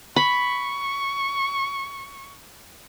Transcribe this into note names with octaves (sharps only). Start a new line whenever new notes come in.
B5 C#6